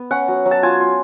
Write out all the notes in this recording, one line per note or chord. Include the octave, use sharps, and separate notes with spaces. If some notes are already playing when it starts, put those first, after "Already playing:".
Already playing: B3
C#4 F#5
F#3
F#3
A5
F4 G#5
F4